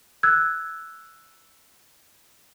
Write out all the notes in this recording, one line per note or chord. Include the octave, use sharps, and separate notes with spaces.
E6 F#6 G#6